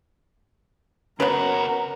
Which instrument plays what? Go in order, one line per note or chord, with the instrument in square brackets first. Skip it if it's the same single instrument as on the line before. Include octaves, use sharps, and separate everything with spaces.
[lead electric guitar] C#3 F#4 [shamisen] B3 B4 [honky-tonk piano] C#4 [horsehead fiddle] A#4